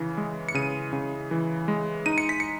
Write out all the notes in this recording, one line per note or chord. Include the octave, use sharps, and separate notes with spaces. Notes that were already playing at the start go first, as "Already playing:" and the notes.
Already playing: C#3 E3
G#3
C#7
C#3 D#7
C#3
E3
G#3
D#4 D#7
C#7
B6
C#7